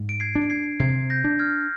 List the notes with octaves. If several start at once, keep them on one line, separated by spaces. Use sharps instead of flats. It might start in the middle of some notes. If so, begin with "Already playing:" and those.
Already playing: G#2
D7
G#6 C7
D4
D7
G#6 C7
C3 G#6 C7
G6 A#6
D4
F6 G#6